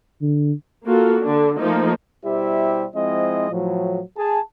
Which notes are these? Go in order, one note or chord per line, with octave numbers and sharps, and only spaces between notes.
D3
A#3 F4 F#4 A4
D3 D4
F3 A3 A#3 D#4
B2 G3 E4 G4 C5 E5
F3 G#3 C4 E4 D#5
A2 F3 F#3
G#4 A5